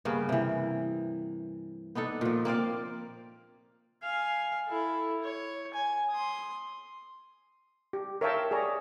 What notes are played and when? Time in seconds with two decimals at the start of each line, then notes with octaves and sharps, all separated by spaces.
0.05 G2 C#3 A#3 B3
0.29 C3 E3
1.95 B3 D4 D#4 A4
2.21 A#2 F3
2.45 A#3 C4 D5 F5
4.03 F5 G#5
4.67 E4 A4
5.23 C#5
5.74 G#5
6.11 C6 D#6
7.93 G4
8.21 A#4 C#5 E5 F5 G5 A5
8.51 G#4 C#5 D5 A#5